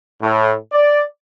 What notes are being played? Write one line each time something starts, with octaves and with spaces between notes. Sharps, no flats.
A2
D5